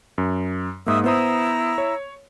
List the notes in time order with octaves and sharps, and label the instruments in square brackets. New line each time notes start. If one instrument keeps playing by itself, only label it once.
[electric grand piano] F#2
[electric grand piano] G#2 A#3 [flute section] E5 D#6 E6
[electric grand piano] B3 C5 D#6 [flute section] E4 A#5 E6
[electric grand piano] C#5